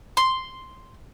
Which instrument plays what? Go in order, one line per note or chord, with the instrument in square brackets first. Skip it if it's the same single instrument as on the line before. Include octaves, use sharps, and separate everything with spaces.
[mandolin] C6